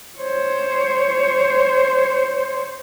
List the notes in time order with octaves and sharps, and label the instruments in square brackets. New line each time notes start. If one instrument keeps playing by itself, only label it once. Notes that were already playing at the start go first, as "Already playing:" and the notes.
[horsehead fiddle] C5 C#5